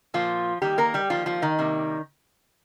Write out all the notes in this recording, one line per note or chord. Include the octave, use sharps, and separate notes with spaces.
A#2 F3 A#3 F4
D#3 G3 A#3 G4
A#3 A#4
G3 G4
D#3 F3 G3 A#3 F4
F3 F4
D#3 D#4
C3 G3 A#3